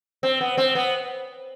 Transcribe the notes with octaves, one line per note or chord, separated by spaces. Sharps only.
C4
B3
C4
B3